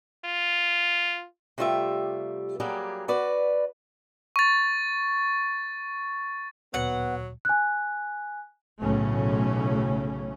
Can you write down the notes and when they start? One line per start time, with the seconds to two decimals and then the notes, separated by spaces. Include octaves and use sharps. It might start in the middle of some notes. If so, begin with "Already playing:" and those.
0.25 F4
1.58 C3 G3 A3 F4 G4 E5
2.60 F#3 G3 A#3 G4 G#4
3.08 F#4 B4 D5
4.36 C#6 A6
6.74 D2 A#2 F#3 B3 F#5
7.45 G#5 F#6
8.80 B1 A2 C#3 A3 C#4